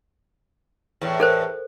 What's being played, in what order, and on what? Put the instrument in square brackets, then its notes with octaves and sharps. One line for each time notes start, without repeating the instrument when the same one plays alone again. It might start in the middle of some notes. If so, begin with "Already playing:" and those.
[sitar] E2 A2
[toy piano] A4 A#4 C5